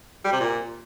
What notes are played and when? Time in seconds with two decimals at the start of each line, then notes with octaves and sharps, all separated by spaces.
0.25 G3
0.32 C3
0.40 A#2